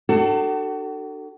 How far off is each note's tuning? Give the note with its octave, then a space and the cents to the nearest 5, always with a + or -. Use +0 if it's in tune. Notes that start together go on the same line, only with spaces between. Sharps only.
D4 +40 F#4 +45 A4 +20